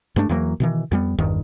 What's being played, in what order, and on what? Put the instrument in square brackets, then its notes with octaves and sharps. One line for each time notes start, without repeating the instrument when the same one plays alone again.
[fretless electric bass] G2 G#3 A3 D4
E2 E3 F#3 A#3
B2 D#3 E3
F2 G3 B3
G1 E2 G2 D#3